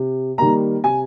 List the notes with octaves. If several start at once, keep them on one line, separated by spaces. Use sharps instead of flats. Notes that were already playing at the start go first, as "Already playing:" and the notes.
Already playing: C3
D#3 G3 A#3 A#5
C3 G#5